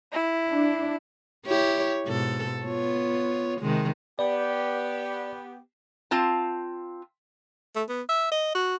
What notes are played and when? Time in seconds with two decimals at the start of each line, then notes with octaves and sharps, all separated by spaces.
0.13 E4
0.49 D4
1.46 E4 G4 C#5
2.06 G#2 B2 A4
2.65 B3 F4 C#5
3.61 C3 D#3 G#3
4.19 B3 G4 D5
6.11 C4 F4 A5
7.76 A3
7.89 B3
8.09 E5
8.31 D#5
8.55 F#4